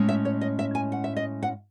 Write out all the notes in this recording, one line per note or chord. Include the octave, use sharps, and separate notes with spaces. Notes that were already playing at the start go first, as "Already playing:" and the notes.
Already playing: A2 G#3 C#4
E5
C#5
D#5
E5
G#5
F#5
E5
D#5
F#5